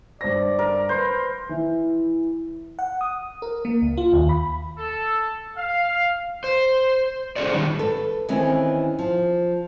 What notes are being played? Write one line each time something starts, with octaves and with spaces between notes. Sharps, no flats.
G2 C5 D5 A#6
A#4
B4 C5 B5
E3
F#5
D#6
A#4
A#3
C#2
F4
D#2
B5
A4
F5
C5
C#4 F#4 G#4 A4 C5 D5
D#3 G3
A4 B4
D#3 E3 C4 C#4 A#4
F3